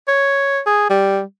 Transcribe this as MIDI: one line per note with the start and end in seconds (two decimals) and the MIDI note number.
0.08 0.60 73
0.66 0.86 68
0.90 1.21 55